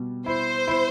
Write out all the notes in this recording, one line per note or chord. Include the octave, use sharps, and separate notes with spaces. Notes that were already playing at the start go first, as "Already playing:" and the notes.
Already playing: B2 G3
E4 C5
E4